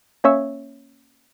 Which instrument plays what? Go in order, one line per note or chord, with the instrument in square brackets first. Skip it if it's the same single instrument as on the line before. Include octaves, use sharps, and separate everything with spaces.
[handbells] A#3 C#4 C#5 E5 C#6 E6